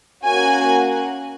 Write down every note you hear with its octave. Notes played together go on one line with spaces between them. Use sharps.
A#3 C#4 F#4 G#5